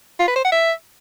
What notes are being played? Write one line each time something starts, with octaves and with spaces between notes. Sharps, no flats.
F4
B4
C5
F#5
E5